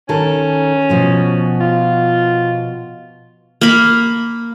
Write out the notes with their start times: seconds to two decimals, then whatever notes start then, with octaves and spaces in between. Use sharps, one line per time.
0.09 D#3 C#4 A4
0.89 B2 F3 F#4
1.60 F4
3.61 A#3 B5